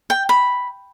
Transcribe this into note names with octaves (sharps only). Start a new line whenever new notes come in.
G5
B5